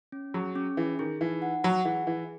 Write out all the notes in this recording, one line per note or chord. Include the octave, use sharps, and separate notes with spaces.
C#4
F#3 G#4
C#4
E3 G#4
D#3 G#4
E3 D#4
F#5
F#3 F#5
E3 G#4
E3 G#4